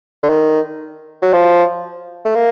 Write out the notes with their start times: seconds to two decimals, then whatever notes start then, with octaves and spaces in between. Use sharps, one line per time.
0.23 D3
0.29 D#3
1.22 F#3
1.33 F3
2.25 A3
2.35 A#3